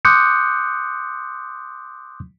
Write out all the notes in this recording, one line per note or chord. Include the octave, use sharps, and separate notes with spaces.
C6 D6 D#6 F#6 G6 C#7